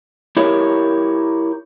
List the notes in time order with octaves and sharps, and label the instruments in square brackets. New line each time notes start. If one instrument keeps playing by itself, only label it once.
[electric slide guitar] E4 G4 A#4 C#5